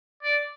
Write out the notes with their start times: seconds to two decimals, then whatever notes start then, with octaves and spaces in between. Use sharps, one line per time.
0.23 D5